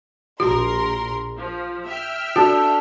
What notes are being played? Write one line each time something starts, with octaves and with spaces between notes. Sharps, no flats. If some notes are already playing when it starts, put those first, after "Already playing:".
A#1 F#4 A#4 C6
F3
E5 G5 F6
D4 F#4 A4